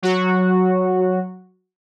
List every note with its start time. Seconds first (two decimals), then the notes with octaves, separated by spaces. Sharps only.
0.02 F#3 F#4